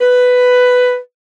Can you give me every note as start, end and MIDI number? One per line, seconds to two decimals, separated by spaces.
0.01 0.97 71